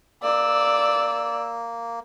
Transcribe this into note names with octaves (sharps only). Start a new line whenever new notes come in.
A#3 D5 E6